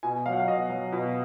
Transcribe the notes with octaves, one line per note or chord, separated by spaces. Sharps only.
B2 G#5
F#3 F5
F#5
F5
B2 D#5
F#3
B2